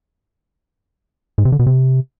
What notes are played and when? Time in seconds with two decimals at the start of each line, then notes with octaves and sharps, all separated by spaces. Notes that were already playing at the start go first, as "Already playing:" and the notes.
1.38 G#2
1.45 C3
1.52 D3
1.59 B2
1.67 C3